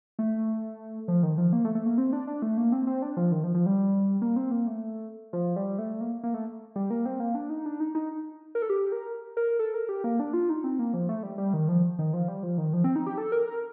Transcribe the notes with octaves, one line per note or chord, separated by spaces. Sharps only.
A3
F3
D#3
F3
A#3
A3
A3
A#3
C4
D4
D4
A3
A#3
C4
C4
D4
F3
D#3
F3
F3
G3
A#3
C4
A#3
A3
F3
G3
A3
A#3
A#3
A3
G3
A#3
C4
A#3
D4
D#4
D4
D#4
D#4
A#4
A4
G4
A#4
A#4
A4
A#4
G4
A#3
D4
F4
D#4
C4
A#3
F3
A3
G3
G3
D#3
F3
D#3
F3
G3
F3
D#3
F3
C4
D#4
G4
A4
A#4
A#4